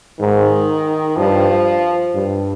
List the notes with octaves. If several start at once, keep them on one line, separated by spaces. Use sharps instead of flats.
G#2 D#3
G2 F3
G2